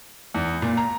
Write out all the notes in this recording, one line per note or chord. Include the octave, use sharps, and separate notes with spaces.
E2
A#2
A#5